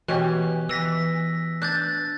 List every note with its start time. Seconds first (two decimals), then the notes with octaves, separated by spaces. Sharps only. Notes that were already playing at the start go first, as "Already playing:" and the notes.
0.08 B2 E3 C#4 G4 F#6
0.69 E3 E6 A#6 B6
1.62 D4 F#6 G6 A6